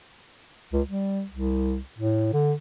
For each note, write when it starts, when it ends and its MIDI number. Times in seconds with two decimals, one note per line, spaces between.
0.73 0.81 37
0.87 1.24 55
1.31 1.79 36
1.99 2.30 45
2.33 2.53 50